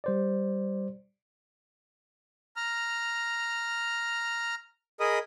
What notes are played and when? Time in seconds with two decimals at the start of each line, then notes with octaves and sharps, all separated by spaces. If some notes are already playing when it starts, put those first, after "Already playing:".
0.04 G3 C5 D5
2.56 A#5 F6
5.00 G#4 A#4 D#5 B5 D#6